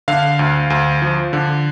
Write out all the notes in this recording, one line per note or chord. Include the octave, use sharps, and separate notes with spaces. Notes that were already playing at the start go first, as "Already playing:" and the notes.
D3 F5
D2
D2
F3
D3